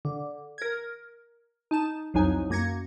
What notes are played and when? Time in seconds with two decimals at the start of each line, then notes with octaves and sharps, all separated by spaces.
0.05 D3
0.58 A#4 G#6
1.71 D#4 A5 E7
2.14 C2 F2 F#3 D#4 G#5
2.50 F#2 A#3 G#6 A#6 C#7